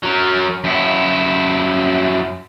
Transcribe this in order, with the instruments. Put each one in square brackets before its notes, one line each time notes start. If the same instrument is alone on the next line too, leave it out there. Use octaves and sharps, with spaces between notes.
[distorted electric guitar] F#3 A#4
F#2 E4